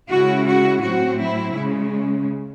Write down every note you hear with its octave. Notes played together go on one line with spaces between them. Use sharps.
C#3 G#3 C#4 E4 F#4
F#4
A2 F#3 C4 F#4
E4
C#3 G#3 C#4